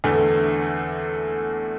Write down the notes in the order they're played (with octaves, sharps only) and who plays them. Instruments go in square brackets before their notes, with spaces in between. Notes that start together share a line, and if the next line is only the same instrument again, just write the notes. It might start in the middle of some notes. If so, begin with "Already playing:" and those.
[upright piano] E2 D3 A3